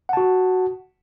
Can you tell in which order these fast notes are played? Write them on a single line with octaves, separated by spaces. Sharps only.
F#5 A5 F#4